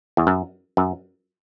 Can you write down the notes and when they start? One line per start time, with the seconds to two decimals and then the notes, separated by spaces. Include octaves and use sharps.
0.17 E2
0.27 F#2
0.77 F#2